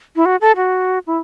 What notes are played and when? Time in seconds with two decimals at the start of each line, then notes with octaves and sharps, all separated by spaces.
0.16 E4
0.25 F#4
0.41 A4
0.56 F#4
1.07 E4